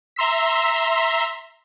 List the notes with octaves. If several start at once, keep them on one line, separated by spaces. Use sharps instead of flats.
E5 A#5 C6 E6 B6